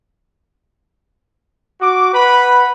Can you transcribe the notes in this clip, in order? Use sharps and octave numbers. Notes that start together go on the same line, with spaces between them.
F#4 D6
B4 F#5 B5